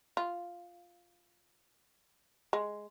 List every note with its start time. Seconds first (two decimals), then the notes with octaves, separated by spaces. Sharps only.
0.17 F4
2.53 G#3